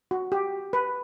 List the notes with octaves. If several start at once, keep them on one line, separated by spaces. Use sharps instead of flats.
F#4
G4
B4